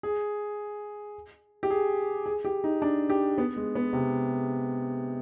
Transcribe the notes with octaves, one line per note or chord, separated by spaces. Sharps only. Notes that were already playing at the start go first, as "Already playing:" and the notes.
G#4
G4
G#4
G#4
G4
D#4
D4
G4
B3
G#3
B3
C3